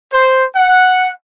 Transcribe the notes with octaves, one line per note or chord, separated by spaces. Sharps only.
C5
F#5